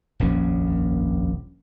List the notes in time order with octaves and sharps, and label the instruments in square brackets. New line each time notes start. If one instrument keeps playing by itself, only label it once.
[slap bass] D#1 A#1 F2 C#4